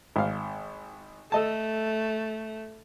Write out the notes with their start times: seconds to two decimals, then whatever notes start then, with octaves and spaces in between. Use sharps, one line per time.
0.16 G#1 F5
1.32 A3 A4 D#5 A5